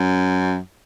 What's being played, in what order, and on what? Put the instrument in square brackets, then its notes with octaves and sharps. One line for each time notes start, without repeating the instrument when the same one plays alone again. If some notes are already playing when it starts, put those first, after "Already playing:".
Already playing: [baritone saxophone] F#2